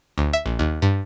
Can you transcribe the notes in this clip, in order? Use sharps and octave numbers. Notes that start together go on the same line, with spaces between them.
D2
E5
A#1
D#2
G2